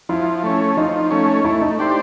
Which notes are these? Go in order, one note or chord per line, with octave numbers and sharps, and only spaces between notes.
F3 E4
A3 C#4
F3 D#4
A3 C#4
A3 E4
D#4
D4 G4 C5